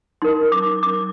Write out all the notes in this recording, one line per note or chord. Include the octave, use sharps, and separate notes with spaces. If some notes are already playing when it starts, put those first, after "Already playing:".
D#4 A#4 C6
D6
D6